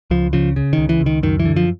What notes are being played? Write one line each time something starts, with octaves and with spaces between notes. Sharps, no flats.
C#2 F3
C#3 F3
C#3
D#3
C#2
E3
C#2
D#3
F#2 D#3
E3
D3
F3